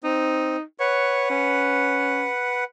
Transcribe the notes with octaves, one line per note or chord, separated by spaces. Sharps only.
C4 D#4
B4 C#5 F#5
C#4